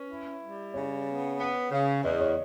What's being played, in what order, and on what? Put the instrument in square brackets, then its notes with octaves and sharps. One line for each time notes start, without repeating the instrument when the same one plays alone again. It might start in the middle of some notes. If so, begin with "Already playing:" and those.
Already playing: [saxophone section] C#4 [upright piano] B4
[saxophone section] E4
G3
[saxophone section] C#3 [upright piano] C#5
[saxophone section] B3
B3
C#3
[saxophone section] E2 [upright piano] D#5
[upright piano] C#5